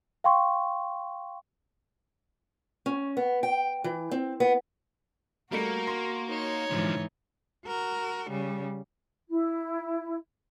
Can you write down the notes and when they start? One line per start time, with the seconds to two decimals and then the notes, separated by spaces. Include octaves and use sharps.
0.24 F5 G5 C6 C#6
2.86 C#4
3.17 B3
3.43 G5
3.84 E3
4.11 C4
4.40 B3
5.52 G3 A3 A#3 F#4 A#4 C#7
5.87 C6 A#6
6.28 D#4 C#5
6.71 G#2 D3 E3 F3
7.65 F#4 A#4
8.30 C#3 G3
9.30 E4